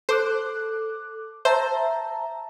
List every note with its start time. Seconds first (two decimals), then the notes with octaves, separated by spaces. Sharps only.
0.09 A4 C5 D6 F#6
1.45 C5 E5 A5 A#5